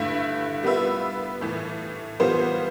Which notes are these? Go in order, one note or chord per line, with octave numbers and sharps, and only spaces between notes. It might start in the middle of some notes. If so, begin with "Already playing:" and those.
Already playing: G2 D3 A3 E4
G3 B3 F4 B4 E5
A2 E3 A3
E3 G3 B3 F4 C5